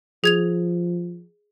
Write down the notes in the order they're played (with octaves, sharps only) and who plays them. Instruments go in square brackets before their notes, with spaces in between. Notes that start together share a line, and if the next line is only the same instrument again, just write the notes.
[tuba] F3 [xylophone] G#4 G#6 F7